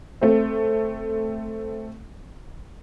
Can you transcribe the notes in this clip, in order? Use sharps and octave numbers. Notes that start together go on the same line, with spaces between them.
A3 C4